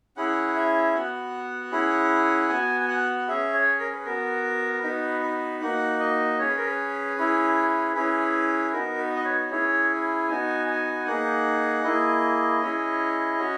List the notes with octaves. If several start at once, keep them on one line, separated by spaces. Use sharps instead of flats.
C#4 E4 G#4 F#5
E5
B3 F#4 F#5
C#4 E4 G#4
B3 F#4 G#5
G#5
F#5
C#4 G#4 E5
C#5
A#4
B4
B3 F#4 A#4
B3 D#4 F#4 B4
B4
A#3 D#4 F#4 F#5
D#5
C#4 G#4 C#5
B4
A#4
B4
C#4 E4 G#4
C#4 E4 G#4 B4
B3 D#4 F#4 A#4
B4
D#5
C#5
C#4 E4 G#4 C#5
B3 D#4 F#4 G#5
G#5
A#3 D#4 G#4 F#5
A#3 E4 G#4 D#5
C#4 E4 G#4
C#4 F#4